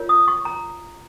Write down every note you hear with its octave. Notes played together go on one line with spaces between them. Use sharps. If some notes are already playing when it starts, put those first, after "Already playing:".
Already playing: F4 A#4 C#5
D#6
C#6
A#5